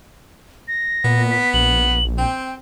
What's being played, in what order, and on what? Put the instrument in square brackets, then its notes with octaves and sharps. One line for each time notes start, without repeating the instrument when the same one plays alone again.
[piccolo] A#6
[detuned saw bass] A#2 [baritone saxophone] B3
[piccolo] B6
[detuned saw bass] A#1 [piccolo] F#7
[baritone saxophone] C4 [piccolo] G5